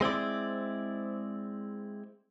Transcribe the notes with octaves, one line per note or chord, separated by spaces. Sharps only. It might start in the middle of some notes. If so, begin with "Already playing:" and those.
G#3 C4 E4 D5